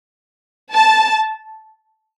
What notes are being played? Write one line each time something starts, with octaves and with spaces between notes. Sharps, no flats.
A5